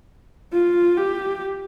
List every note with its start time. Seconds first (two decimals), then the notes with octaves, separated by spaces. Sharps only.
0.53 F4
0.97 G4